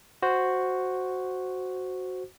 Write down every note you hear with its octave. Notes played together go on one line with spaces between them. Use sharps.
F#4 C5